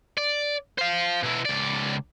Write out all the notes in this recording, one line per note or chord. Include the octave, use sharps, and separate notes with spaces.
D5
C5 F5
B2 E4
C#2 D5